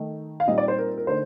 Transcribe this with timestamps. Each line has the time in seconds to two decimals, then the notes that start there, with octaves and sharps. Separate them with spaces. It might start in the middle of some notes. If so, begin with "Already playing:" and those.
Already playing: D#3 A3 D#4
0.40 F5
0.47 A#2 G3 C4 D#4 D#5
0.58 D5
0.68 C5
0.79 A#4
0.97 A#4
1.07 D3 A3 D#4 C5